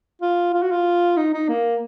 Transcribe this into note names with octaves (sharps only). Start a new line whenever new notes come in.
F4
F4
F#4
F4
D#4
D#4
A#3